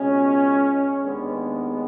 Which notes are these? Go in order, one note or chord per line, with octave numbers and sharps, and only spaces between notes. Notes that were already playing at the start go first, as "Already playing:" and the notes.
Already playing: C#2 B2 G#3 C#4
D#2 D#3 G#3 B3 D4